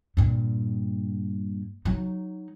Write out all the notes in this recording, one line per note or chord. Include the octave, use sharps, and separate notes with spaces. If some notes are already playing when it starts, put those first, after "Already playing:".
G2 A#2
F#3 D#4